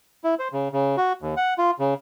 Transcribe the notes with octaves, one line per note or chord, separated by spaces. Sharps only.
E4
C5
C#3
C#3
F#4
D#2
F#5
F4
C#3